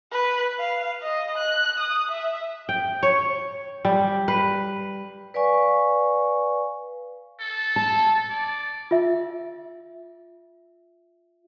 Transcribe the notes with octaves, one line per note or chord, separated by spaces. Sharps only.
B4
F5
D#5
F#6
D#6
E5
G5
C#5
G3
B4
B4 D5 F5 G#5 C#6
A4
A5
D5
F4 E5